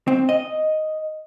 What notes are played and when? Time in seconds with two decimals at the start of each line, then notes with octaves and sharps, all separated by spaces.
0.08 C4
0.29 D#5